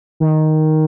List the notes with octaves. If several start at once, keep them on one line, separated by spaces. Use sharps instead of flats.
D#3